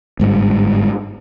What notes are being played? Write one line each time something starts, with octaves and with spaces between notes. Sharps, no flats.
G1 G#2 G3